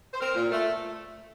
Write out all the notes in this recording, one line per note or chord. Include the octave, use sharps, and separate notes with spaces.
C5
C4 A#4
A#2
A3